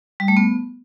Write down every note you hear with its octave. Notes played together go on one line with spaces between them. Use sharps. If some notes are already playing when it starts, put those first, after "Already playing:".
G3
A3
B3